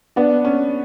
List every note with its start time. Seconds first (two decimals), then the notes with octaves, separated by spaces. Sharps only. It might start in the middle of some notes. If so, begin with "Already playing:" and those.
0.16 B3 D4
0.45 C#4